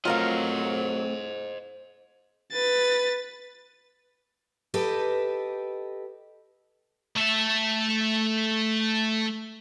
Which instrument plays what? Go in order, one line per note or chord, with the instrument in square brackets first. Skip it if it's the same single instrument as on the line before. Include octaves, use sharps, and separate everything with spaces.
[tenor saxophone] F#3 [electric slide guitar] A3 C4 [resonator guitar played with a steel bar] F4 A#4 F5 [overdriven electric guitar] C5 D#5
[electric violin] B4 A6
[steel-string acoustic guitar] G4 A4 B4 D#5
[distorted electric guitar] A3 E5